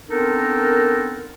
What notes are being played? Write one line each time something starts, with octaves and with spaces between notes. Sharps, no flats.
B3 C4 D4 D#4 A4 A#4